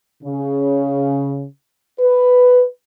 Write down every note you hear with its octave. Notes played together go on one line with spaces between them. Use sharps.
C#3
B4